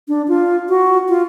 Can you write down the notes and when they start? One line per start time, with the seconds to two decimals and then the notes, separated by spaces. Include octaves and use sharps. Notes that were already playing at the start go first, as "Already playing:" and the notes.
0.08 D4
0.28 F4
0.69 F#4
1.09 F4